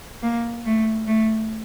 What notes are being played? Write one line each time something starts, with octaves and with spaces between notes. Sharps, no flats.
A#3
A3
A3